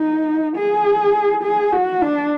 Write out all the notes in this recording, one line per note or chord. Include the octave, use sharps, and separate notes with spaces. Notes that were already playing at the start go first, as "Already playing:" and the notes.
Already playing: D#4
G#4
G#4
F#4
D4